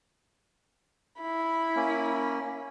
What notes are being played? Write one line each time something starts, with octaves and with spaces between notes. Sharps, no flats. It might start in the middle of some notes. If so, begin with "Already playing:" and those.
E4 B5
A#3 C#4